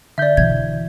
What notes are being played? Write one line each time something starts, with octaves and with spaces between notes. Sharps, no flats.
D3 D5 E5 G6
B2 E3 G#6